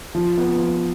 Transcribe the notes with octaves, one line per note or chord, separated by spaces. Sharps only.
F3
B3
F3